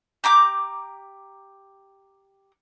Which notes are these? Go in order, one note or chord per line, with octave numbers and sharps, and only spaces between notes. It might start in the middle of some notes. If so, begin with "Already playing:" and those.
G4 A#5 D6 G6